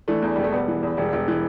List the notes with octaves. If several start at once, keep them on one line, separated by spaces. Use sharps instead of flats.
E3 A3 D4
E2
E1 G3
A3
E1 G3 B3
E3
E2
E1 G3
E1
E3